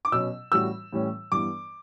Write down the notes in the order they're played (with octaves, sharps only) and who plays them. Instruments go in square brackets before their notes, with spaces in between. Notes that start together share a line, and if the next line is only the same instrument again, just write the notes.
[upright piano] D6
[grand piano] B2 F#3 C#4 [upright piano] E6
[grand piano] A2 E3 G3 C#4 F#4 [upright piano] E6
[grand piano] A2 E3 G3 C#4
[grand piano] G2 E3 B3 [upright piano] D6